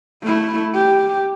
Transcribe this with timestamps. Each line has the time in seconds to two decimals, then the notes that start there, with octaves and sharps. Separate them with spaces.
0.23 A3 E4
0.74 G4